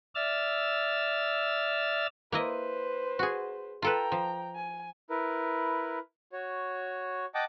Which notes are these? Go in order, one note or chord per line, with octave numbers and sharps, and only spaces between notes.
D5 E5 E6 F6 A6
A#3 E4 B4 C5 D#5
F#4 G#4
F4 A4 B4 G5 A#5
F3
G#5
E4 A#4 B4
F#4 C#5
D#5 F#5 G5 A5 D6